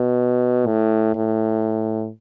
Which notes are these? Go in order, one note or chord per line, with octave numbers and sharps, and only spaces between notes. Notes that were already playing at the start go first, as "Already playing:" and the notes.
Already playing: B2
A2
A2